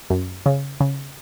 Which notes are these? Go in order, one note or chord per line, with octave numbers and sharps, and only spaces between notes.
F#2
C#3
C#3